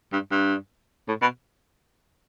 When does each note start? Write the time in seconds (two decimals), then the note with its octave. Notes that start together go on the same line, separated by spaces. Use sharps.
0.13 G2
0.31 G2
1.08 A2
1.22 B2